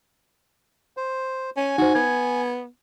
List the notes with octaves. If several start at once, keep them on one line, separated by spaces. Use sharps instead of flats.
C5
C#4 G#5
D#4 F#4 C5
B3 G#6